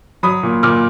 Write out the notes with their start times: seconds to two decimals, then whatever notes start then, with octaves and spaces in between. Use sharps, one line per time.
0.23 F#3 B5 D#6
0.43 A#2
0.63 A#2 D6 F6